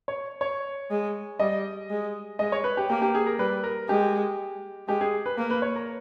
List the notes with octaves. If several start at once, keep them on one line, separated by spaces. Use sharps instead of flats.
C#5
C#5
G#3
G3 D#5
G#3
G#3 D#5
C#5
B4
G4
A#3 G4
G4
G#4
A#4
G3 B4
A#4
G#3 G4
G#3 G4
G#4
B4
A#3 B4
B4
C#5
A#4